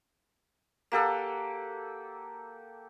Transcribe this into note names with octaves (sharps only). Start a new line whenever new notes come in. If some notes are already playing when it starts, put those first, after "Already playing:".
A#3 G4 A4 F#5